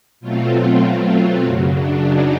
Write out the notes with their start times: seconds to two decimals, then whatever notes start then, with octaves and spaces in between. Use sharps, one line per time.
0.20 B2 F#3 A3 C4 F4
1.43 F#2 C#3 F#3
1.75 D4
2.06 D#4